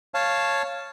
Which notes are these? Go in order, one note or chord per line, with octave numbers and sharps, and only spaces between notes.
C#5 F5 A5